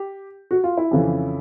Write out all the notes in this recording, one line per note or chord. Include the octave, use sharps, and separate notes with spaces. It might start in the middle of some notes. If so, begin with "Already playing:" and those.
Already playing: G4
F#4
F4
E4
F2 C#3 E3